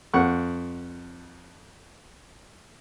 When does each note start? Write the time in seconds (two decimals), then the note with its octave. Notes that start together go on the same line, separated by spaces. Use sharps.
0.14 F2 F#5 C#6